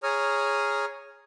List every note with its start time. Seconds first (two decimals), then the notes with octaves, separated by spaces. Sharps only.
0.03 G#4 C#5 A#5 D#6 F6